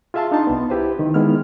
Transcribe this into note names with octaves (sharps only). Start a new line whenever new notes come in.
F4 G#4 E5 F5 A5 C6
D4 D#4 A5 C6
C2 B3
E4 G4 B4 C5
D#3
D#3 G#3 B3 E4 F6